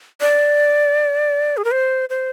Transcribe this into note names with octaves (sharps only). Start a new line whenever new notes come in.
D5
G#4
A#4
C5
C5